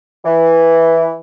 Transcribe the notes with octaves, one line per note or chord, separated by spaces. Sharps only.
E3